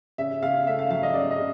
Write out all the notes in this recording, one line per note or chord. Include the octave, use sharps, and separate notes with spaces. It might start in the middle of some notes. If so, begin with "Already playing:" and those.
C#3 E5
C#3 F5
A3 E5
F5
F#3 F5
D#5
C#3 D5
D#5
C#3